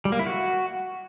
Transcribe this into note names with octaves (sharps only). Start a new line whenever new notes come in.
G3
A#3
E4
F#4